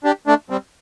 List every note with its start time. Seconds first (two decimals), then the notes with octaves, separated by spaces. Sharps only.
0.04 D4 G4
0.27 A3 D4
0.50 G3 C4